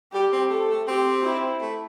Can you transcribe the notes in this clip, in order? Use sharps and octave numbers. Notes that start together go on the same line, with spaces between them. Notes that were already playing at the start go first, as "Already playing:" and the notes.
G3 G4
C4
A3 A4
A3
C4 G4
E4
A3